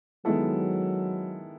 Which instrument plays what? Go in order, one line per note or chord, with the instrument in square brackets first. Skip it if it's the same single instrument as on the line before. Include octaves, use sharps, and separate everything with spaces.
[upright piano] D#3 G#3 B3 E4 A4 [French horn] F#3